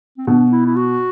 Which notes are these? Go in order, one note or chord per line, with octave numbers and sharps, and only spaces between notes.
C4
B2 D4
E4
E4
F#4